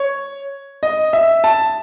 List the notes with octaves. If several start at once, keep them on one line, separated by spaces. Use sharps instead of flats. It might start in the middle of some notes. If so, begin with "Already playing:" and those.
Already playing: C#5
D#5
E5
A5